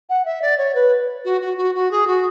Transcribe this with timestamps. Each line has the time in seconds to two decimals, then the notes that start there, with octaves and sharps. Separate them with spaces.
0.09 F#5
0.25 E5
0.42 D5
0.58 C#5
0.75 B4
1.25 F#4
1.41 F#4
1.57 F#4
1.75 F#4
1.91 G#4
2.07 F#4